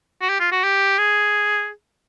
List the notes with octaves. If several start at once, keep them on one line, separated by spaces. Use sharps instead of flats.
F#4
G4
F4
F#4
G4
G#4